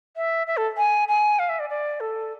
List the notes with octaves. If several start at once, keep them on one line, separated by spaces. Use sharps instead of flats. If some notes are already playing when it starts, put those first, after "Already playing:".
E5
E5
A4
G#5
G#5
F5
E5
D5
D5
A4